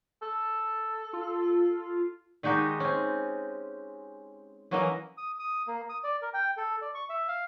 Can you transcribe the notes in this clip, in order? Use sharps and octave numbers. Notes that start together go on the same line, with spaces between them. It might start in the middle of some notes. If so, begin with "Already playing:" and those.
A4
F4
D#3 G#3 D#4 F#4 G4
C4 C#4
E3 F#3 A#3 C#4 A#4 D#5
D#6
D#6
A#3
D#6
D5
A#4
G5
A4
D5
C#6
E5
F5